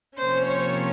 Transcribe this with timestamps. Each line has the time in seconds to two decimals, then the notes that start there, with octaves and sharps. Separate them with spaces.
0.18 C3 F3 A#3 C#4 C5
0.47 C#5